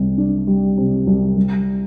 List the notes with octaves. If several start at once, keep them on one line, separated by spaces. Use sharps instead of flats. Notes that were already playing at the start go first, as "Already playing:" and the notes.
Already playing: C2 C3
D4
G3
C3
C2
G3